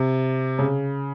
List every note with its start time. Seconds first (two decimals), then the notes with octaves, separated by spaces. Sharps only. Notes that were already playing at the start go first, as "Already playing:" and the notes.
Already playing: C3
0.59 C#3